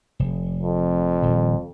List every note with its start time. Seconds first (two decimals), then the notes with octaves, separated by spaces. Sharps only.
0.19 F1
0.63 F2
1.23 D#1